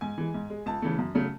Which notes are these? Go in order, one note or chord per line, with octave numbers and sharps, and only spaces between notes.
G#2 G#5
E3 G#3
G#2
G#3
C#2 A5
C#3 E3 A3
F#2
C#3 F#3 A3